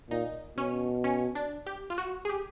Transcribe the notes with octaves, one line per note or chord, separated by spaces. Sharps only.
A#2 D#4
B2 C#4
C#4
D4
G4
F4
F#4
G#4
G4